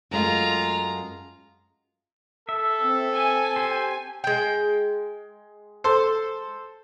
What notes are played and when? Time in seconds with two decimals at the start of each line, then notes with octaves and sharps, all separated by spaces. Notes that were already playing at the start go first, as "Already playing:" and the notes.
0.11 F#2 G#3 A3 F4 A#5
2.49 A4 E5
2.83 C4
3.13 G#5
3.56 G4 C5
4.24 G#3 G5
5.84 A4 C5 C6